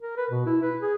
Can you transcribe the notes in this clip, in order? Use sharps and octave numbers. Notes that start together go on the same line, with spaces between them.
A#4
B4
B2
E4
B4
G#4